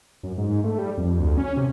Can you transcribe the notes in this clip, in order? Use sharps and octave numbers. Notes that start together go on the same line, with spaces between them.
F#2
G#2
A3
G3
F2
D2
C#4
C3